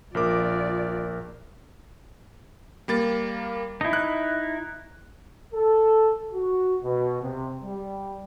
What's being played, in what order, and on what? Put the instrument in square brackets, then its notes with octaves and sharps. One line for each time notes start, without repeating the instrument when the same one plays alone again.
[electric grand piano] A#1 A#4 D6 [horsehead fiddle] F4 D5
[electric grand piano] G3 A#3 A6
[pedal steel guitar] D#4 E4
[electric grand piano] F#6
[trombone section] A4
F#4
B2
C3
G3